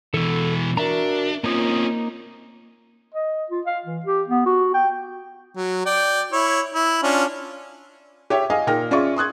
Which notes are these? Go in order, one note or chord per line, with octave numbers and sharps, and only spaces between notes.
B2 E3 A4 E6
D4 F#4 A#4 E5 A#5
A#3 C4 C#4 D#4 F4 D#6
D#5
F4
F5
E3
G4
B3
F#4
G5
F#3
D5 G5
E4 C#5
E4
C#4 D4 F4
G4 C#5 E5
D#5 F5 G#5
A#2 D#3 G5 F6 A#6
C#4 F4 G#4 D5 E5 C#6
C6 D#6 F#6 G#6